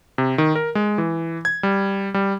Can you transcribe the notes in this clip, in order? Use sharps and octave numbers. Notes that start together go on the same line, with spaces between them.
C3
D#3
A#4
G#3
E3
G#6
G3
G3